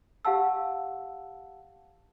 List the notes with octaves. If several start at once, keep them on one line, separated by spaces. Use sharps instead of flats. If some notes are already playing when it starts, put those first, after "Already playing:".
G4 F5 F#5 A5 E6